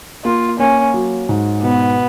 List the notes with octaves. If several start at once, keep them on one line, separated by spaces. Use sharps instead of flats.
A#3 F4
A#3 C#4
F#3
G#2
B2 B3